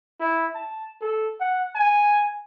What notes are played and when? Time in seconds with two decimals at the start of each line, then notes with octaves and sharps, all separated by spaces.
0.20 E4
0.55 A5
1.01 A4
1.40 F#5
1.75 G#5